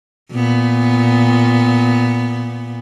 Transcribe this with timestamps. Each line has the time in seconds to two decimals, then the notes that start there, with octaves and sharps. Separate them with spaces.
0.32 A#2 B3